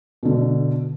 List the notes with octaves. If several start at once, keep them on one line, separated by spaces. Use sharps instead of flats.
B2 D3